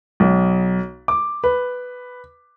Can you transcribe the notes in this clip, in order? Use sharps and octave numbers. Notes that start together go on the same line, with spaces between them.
B1
D6
B4